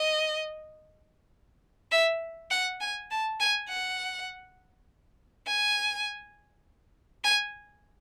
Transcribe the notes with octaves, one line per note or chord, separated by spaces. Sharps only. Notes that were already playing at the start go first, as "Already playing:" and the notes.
Already playing: D#5
E5
F#5
G#5
A5
G#5
F#5
G#5
G#5